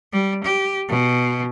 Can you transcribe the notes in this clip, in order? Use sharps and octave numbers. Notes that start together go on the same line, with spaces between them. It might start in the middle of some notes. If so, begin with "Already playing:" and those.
G3
G4
B2